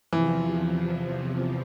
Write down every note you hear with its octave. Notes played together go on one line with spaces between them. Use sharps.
E2 C3 E3 F3